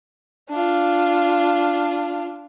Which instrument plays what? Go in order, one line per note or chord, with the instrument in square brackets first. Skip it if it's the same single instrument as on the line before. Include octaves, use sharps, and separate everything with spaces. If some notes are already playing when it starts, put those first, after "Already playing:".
[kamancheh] D4 F4